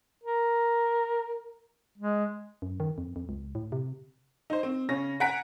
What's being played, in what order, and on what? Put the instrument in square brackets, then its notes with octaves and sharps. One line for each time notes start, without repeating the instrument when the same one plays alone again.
[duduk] A#4
G#3
[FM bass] F#2
D#3
F2
F2
C#2
A2
C3
[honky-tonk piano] D#4 C5
C4
C#3 C#4 A#6
F#5 G#5 A#5 F#6 B6 D7